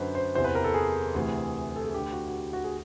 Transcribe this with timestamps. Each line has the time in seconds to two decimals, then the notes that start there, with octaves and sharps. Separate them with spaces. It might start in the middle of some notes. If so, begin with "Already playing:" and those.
Already playing: F#2 D3 B4 C5
0.15 C5
0.35 E2 C3 E3 C5
0.44 B4
0.55 A#4
0.64 A4
0.74 G#4
1.15 D2 C3 E3
1.76 A4
1.85 G#4
1.94 D2 D3 G4
2.13 F#4
2.28 F#4
2.34 G4
2.53 F#4
2.64 G#4